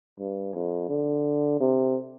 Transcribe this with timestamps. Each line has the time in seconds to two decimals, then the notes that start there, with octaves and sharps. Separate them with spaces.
0.19 G2
0.54 F2
0.89 D3
1.60 C3